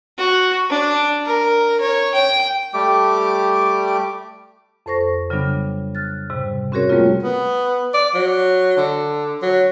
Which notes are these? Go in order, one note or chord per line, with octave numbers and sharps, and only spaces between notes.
F#4
D4
A#4
C#5
G5
G3 A3 G4 D6
F2 A4 C5 C#6 A#6
C#3 F#3 G3 B3 D4
F6 F#6 A6
G#2 C3 G3
C4 C#4 F#4 G#4 A#4 C#5
F#3 G3 A3 A#3 C4 F4
B3
D5
F#3
D3
F#3